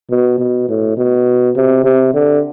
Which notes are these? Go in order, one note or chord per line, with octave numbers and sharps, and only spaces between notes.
B2
B2
A2
B2
C3
C3
D3